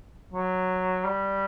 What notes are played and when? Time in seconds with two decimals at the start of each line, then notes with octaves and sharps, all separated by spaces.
0.33 F#3
1.05 G3